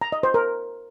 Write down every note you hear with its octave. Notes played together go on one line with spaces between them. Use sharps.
A#5
D#5
C5
A#4